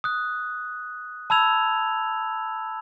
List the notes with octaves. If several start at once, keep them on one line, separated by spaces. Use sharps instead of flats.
D#6 F#6
A5 B5 E6 G#6 F7